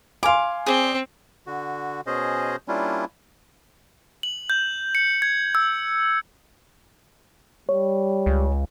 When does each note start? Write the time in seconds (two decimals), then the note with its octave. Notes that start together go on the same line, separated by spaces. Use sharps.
0.23 F5 G#5 C6 D6
0.66 C4 G#4 D5
1.47 D3 F#4
2.07 B2 C#4 G#4 C5 D#5
2.68 G3 A#3 C#4 D4 E4 F4
4.23 F#7
4.50 G6
4.95 C#7
5.22 G#6
5.55 E6
7.69 G3 C#5
8.26 C#2